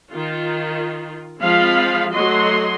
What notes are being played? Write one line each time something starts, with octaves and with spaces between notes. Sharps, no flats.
D#3 F4
F3 G#3 C4 F4 F5 B5
F#3 A3 F#4 D#5 C6